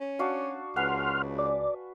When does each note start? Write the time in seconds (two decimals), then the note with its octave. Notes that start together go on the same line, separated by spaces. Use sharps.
0.01 C#4
0.19 D4 F#4 F5
0.76 C#2 B4 F#5 G#5 C6 F6
1.39 D5